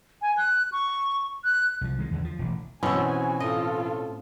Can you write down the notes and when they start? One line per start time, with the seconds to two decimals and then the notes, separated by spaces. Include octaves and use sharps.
0.22 G#5
0.37 F#6
0.72 C#6
1.45 F#6
1.81 C2 F3
1.99 D#3 G#3
2.11 E2 D3
2.25 F3
2.39 E1 A1
2.83 B2 E3 C4 C#4 F#4 G#5 E6
3.40 A2 F4 A4 D#5